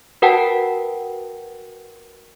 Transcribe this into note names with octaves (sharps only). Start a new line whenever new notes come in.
F#4 A#4 B4 F#5 G5 A5